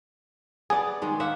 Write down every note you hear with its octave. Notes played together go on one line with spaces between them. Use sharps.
B3 G#4 D5
D#3 G#3
A#3 E5 F#5